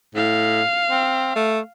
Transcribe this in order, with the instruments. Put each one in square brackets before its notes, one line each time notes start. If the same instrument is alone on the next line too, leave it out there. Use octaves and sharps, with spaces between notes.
[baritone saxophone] A2 [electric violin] F5
[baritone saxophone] C4
A3